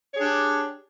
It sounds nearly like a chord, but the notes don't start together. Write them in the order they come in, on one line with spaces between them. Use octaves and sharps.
C#5 G#4 D4 G4